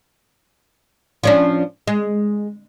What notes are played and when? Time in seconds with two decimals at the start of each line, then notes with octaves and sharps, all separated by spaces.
1.23 F3 C#4 D4
1.88 G#3